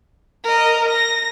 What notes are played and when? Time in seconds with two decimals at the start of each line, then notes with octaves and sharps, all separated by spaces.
0.44 A#4 D#5
0.89 A#6